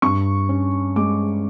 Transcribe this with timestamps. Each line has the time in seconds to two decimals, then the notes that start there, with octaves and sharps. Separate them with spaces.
0.02 G2 C#6
0.49 C#4
0.96 G#3 D6